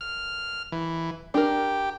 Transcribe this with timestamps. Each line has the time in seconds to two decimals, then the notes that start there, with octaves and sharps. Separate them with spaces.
0.01 F6
0.72 E3
1.34 D4 G4 A#4